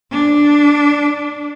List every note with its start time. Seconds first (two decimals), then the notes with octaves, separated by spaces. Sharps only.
0.11 D4